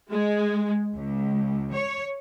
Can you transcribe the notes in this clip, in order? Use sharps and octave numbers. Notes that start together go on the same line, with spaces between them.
G#3
C#2
C#5